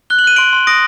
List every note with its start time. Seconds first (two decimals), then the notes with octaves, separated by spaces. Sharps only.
0.10 F#6 G7
0.19 F#7
0.24 F#6 D#7
0.36 C6 D7 F#7
0.53 C6
0.67 D#6 A#6 D7